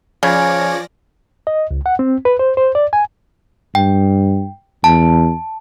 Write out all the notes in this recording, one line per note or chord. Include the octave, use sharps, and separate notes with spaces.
C#3 F3 C#5 D5 G#5 F6 A#6
D#5
C#2
F#5
C4
B4
C5
C5
D5
G#5
G2 G5
E2 A5